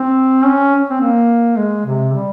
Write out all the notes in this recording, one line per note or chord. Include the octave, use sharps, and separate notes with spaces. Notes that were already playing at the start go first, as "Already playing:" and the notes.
Already playing: C4
C#4
C4
A#3
G#3
C3
G3